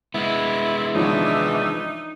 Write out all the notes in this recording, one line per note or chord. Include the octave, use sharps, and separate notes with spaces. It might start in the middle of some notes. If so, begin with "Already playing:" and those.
G#3 B3 E4
G#1 E3 F3 D4 D#4 C#5 E5